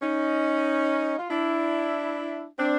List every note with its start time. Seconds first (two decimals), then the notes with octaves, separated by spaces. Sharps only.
0.02 C#4 D#4
1.19 F4
1.30 D4 E4
2.58 C4 D4